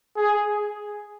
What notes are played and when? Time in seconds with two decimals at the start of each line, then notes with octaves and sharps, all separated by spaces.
0.17 G#4